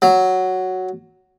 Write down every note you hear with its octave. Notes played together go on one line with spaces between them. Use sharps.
F#3